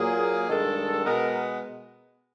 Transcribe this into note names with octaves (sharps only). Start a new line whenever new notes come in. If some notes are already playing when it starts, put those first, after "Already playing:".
Already playing: A#2 F#3 A#3 G#4
G2 D#3 G#3 A4
B2 G#3 B3 A#4